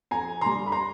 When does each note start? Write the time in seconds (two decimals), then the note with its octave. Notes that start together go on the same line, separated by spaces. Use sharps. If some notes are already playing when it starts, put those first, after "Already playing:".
0.11 F2 G#5 A#5
0.41 D3 G3 A#5 C6
0.66 B5
0.72 A#5 C6